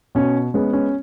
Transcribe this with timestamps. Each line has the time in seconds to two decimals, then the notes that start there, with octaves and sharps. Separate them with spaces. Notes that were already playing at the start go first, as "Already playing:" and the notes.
0.15 B2 C#4
0.54 G#3 B3 C#4
0.73 C#4